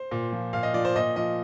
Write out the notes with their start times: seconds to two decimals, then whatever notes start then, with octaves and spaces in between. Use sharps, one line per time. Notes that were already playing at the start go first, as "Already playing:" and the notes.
Already playing: C5
0.11 A#2
0.32 F3
0.53 A#2 F5
0.63 D#5
0.74 F3 D5
0.85 C5
0.96 A#2 D#5
1.16 F3 D#5